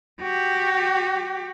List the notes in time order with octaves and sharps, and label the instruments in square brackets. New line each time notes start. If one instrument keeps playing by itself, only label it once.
[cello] F#4 G4